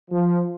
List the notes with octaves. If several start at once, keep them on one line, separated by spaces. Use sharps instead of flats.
F3